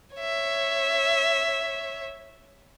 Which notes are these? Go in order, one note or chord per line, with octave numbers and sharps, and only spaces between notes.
C#5 E5